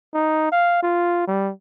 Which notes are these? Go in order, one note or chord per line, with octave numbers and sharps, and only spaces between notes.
D#4
F5
F4
G3